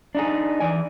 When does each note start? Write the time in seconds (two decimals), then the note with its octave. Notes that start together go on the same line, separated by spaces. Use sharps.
0.15 D4 D#4 G#4
0.60 E3 D5 G#5